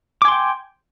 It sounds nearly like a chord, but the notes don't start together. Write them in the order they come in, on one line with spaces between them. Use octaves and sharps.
D6 G#5 C6 G5